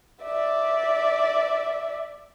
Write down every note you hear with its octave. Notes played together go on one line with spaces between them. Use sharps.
D5 E5